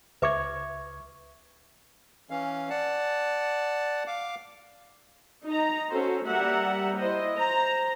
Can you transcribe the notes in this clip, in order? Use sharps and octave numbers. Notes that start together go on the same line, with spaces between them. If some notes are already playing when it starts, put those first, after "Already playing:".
C#2 B4 E5 C#6 D6 G#6
E3 C#4 F5
D5 F#5 A5
F5 D6
D#4 A#5
C#4 F#4 A4 C5
G3 A#3 E5 F#5 A#5
E4 C5 D#5
C5 A#5